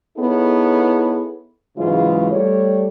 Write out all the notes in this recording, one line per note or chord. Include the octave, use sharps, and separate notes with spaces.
B3 D#4 E4 G#4 A4 C#5
G#2 C#3 E3 F#3 G#3 F4
G3 A3 C#5